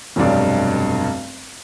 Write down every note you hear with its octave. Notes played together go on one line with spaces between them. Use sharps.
F1 B1 G2 D5